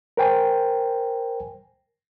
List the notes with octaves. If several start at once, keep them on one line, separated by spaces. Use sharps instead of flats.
A#4 C5 G5 G#5